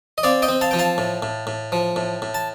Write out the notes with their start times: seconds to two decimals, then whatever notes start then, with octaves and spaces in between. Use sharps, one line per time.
0.18 D#5
0.23 C4 D5 F5
0.42 D#5 G5
0.48 C4
0.61 F5 A5
0.71 F3 G5
0.79 F5 A5
0.98 A2
1.22 A2
1.47 A2
1.72 F3
1.96 A2
2.22 A2
2.34 A5